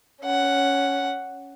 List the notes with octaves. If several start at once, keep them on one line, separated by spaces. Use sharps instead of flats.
C#4 F#5